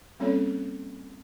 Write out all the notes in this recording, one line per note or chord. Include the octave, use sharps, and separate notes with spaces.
G3 A#3 C4 C#4 A4 C#5